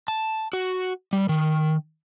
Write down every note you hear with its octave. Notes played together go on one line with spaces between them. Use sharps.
A5
F#4
G3
D#3